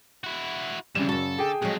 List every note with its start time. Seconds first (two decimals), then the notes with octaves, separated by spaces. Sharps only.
0.24 E4 F#4
0.95 F2 C#3 E3 G3 E7
1.09 F#2 F#4 A4
1.38 D3 G#4 G5
1.62 F2 F#3 G#3